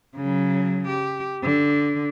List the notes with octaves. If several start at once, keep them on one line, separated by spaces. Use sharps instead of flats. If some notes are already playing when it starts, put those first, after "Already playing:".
C#3 F#3
G4
D3